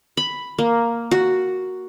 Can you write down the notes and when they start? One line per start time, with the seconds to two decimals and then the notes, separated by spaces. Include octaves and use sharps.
0.17 B5
0.58 A#3
1.11 F#4